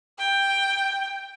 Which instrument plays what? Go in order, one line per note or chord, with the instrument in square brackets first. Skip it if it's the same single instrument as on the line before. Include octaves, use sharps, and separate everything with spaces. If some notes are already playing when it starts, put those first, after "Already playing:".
[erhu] G5